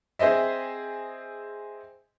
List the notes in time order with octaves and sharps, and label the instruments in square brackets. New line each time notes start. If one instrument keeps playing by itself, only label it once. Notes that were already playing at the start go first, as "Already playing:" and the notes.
[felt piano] C4 G#4 C5 D#5 E5